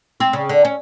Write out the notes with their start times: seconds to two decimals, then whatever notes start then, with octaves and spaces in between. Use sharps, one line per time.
0.20 C4
0.33 C#3
0.49 D3
0.65 C#4